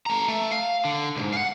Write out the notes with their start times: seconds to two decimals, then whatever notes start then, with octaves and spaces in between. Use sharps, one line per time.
0.06 A3 A#5
0.28 A3
0.51 F5
0.85 D3
1.16 C#2 G#2
1.33 F5 F#5